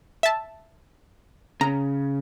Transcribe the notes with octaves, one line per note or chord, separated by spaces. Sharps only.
E5 A5
C#3 A#5